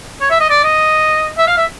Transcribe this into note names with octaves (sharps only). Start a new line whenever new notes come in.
C#5
E5
D#5
D5
D#5
E5
F5
E5